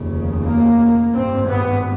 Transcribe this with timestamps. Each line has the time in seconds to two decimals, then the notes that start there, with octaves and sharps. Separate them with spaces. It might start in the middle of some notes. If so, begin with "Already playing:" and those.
Already playing: F1 D#2 C#3
0.45 A#3
1.14 G#1 G2 C4
1.49 B3